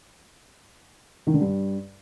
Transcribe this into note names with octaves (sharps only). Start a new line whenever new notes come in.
D#3
D3
G2